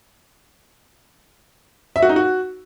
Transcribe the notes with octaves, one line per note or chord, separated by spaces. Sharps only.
E5
F#4
D#4
F#4